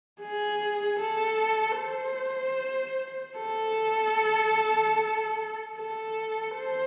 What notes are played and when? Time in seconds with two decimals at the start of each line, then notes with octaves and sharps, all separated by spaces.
0.21 G#4
0.99 A4
1.79 C5
3.38 A4
5.77 A4
6.56 C5